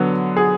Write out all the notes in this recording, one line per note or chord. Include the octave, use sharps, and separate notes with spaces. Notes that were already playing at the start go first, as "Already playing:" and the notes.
Already playing: D3 F#3 B3
G#4